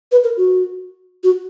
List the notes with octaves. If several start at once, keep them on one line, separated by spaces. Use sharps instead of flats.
B4
A#4
F#4
F#4